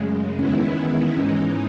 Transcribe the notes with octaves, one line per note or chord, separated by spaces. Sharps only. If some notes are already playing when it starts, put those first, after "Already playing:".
Already playing: F#2 C#3 G#3 A3
E2 D#3 G#3 B3 C#4 E4
G#2 E3 G#3 C#4 D#4
B3
C#4